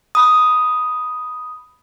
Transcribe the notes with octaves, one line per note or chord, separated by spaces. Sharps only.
B5 D#6